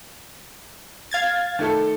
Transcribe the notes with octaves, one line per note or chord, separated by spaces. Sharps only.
F5 G#6 A6
D#3 A3 A4